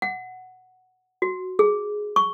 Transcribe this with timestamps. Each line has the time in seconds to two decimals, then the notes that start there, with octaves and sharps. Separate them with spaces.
0.02 F#5
1.22 F#4
1.59 G#4
2.16 C#6